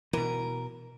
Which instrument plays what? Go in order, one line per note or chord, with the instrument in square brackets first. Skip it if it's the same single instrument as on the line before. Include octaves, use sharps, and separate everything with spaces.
[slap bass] B2 E3 [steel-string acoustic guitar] A#4